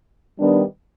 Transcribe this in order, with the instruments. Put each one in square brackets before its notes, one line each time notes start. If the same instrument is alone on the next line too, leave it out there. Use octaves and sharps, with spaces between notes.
[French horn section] D#3 G3 B3 D4